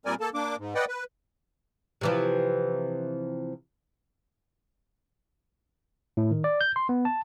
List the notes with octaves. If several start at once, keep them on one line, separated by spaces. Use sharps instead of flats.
A#2 G3 C4 A#4 D5 G#5
A#3 A4 A5
A#3 D4 D6
G#2
B4 D5 D#5 F#5 G5
B4
C3 E3 F3
A2
D#3
D5
G6
C6
B3
A5